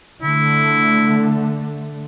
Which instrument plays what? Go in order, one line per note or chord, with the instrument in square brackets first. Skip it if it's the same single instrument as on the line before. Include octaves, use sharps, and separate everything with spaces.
[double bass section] D3 A3 [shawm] E4